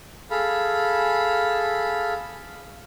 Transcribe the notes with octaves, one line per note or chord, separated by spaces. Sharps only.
G#4 A4 F5 B5